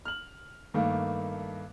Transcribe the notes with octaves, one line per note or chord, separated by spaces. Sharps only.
F6 F#7
G2 D#3 A3 A#3